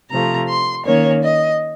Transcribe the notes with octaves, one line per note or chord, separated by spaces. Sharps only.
C3 F3 A3 A#5
C6
D#3 A#3 C#4 C#5
D#5